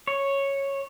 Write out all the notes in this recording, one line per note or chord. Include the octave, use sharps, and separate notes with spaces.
C#5